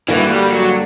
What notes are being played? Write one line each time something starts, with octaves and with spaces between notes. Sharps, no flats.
G2 D3 E3 A#3 D4 F#4
G3
F#3